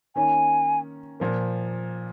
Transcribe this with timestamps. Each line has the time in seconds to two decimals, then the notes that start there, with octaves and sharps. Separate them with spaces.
0.16 D#3 A#3 C#4 G#5
1.20 A#2 F3 A#3